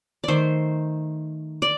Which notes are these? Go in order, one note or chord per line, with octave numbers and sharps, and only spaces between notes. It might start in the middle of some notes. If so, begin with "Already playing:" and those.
D#3 A3 C5 D5
D5